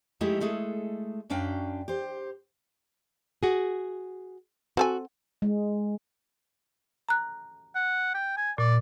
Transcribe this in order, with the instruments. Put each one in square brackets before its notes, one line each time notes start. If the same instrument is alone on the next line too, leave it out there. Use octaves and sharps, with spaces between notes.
[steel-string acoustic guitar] F3 G#3 A3 D#4 E4 G4
G#3 A3 G#4 A4
F#2 F#3 C#4 D4 F5 G5
G4 C5
[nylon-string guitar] F#4 G#4
[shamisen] C4 A4 G#5 [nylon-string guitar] F#4
[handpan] G#3
[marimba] A#5 F#6
[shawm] F#5
G5
G#5
[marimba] A#2 [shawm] D5